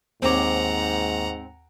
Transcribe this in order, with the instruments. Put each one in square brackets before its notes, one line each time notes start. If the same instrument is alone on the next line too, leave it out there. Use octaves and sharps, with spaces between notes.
[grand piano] D#2 G5 D6 [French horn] G#2 [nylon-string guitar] C4 C#5 [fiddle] F#5 A#5